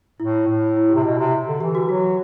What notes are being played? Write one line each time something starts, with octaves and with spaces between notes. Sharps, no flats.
A2 E4
A2
E4
G4
C3
B2
C3
D3
E3 G4
F#4
F#3 F#4